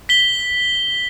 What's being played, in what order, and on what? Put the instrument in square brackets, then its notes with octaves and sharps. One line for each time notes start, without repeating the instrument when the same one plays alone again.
[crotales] B6 G7